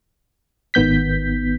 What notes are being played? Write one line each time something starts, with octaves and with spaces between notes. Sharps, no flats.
G#1 D#3 B3 G6 B6